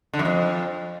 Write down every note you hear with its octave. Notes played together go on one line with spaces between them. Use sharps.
D3
F#2
F2